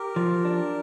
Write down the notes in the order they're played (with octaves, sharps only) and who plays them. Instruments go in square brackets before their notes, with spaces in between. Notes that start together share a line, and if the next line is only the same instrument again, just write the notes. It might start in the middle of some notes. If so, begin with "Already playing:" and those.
Already playing: [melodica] G4 A#4
[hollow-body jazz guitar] F3
D4